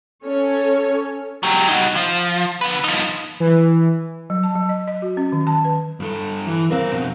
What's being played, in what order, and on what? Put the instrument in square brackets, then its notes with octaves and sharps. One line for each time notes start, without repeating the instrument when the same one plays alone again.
[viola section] C#4 A4 C#5
[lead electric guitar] F#3 G4
D#4 F#4
F3
D3 B4
F3 D#4
[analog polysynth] E3
[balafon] F#3
A5
F#3
D#5
D#5
F#4
C#4
D#3
A5
B4
[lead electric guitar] G2 A4
E3
[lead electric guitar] C2 F5 [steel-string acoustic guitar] C4 A#4
[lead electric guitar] F2 B2